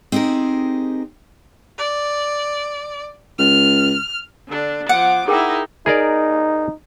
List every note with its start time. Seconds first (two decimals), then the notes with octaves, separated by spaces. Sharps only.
0.12 C4 D#4 G4 G#4 A#4
1.78 D5
3.39 C#2 F6
4.48 D3 D4
4.89 F3 F#5 D6
5.28 D#4 E4 G#4 A#4 G5
5.86 D#4 G#4 A#4 D5